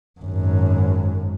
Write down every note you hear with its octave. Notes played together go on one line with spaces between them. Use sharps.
G#1 F#2